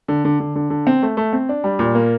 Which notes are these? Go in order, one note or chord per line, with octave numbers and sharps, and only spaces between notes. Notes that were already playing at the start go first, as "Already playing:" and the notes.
D3
D3
D3
D3
D3
C4
A3
A3
C4
D4
G3
A#2
A#3